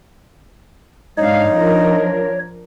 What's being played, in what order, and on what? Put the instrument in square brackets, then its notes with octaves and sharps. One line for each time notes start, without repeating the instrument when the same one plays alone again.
[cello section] G#2 D4 F5 [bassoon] D#4 [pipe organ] C#5
[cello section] F3 D4 A#4